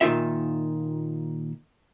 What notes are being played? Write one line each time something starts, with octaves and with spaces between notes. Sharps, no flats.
A#2 D#3 D#4 F4 E5